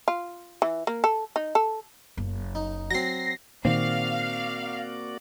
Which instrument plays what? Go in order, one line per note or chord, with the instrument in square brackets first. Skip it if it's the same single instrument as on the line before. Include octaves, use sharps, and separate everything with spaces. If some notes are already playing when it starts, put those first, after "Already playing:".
[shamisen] F4
E3
A#3
A4
D#4
A4
[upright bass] F#1
[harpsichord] D#4
[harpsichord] F#3 C4 [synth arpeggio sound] A#6 C7
[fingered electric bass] A#2 D#3 [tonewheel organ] A#3 F#4 D5 [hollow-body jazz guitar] C4 [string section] F5